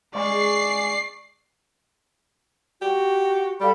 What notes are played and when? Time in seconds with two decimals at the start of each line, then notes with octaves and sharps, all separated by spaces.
0.15 G#3 D5 C#6 C7
2.82 F#4 G4
3.61 G3 A4 F5 B5